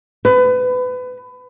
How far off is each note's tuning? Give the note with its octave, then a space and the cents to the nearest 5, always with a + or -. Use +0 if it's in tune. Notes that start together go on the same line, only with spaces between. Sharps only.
B4 +25